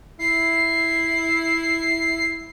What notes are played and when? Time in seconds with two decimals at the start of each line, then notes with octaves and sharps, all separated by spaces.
0.19 E4 C7